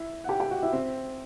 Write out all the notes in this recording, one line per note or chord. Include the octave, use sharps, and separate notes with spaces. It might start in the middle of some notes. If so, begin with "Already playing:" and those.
Already playing: E4 E5
F#5
G4 G5
G4 G5
F#4 F#5
E4 E5
C4 C5